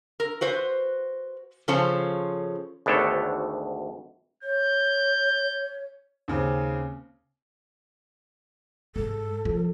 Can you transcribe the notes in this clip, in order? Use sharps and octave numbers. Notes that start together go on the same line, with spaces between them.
A#4
F#4 B4 C5
C#3 F3 C#4 A4 C5 A5
G#1 D2 B3 D4 A4 C#5
C#5 G6
D#2 C#3 C4
G#2 A4
F3